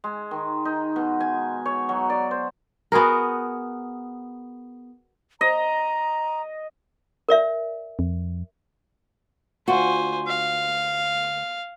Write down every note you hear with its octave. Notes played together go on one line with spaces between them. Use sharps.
G#3
D#3
D#4
B2
G#5
C#5
F#3
D5
C5
B3 F#4 G#4 A#4
D#5 A#5
A#4 D5 E5
F2
D2 F4 F#4 C5 G#5
F5